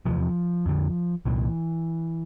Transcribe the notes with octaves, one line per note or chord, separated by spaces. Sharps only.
E2 C3 F3
F2 D3
C2 A#2 E3